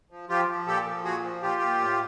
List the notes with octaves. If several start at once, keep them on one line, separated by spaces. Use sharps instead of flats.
F3
F3 F4 G4
F3
A#2 G4 A4
F3
A#2 F#4 G#4
F3
A#2 F4 G4
A#2
A2